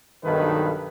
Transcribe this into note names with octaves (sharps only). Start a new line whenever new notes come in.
B1 G2 D#3 D#4 A4 B4